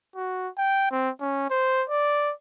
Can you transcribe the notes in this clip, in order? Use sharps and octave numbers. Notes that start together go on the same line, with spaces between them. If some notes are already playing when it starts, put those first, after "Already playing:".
F#4
G5
C4
C#4
C5
D5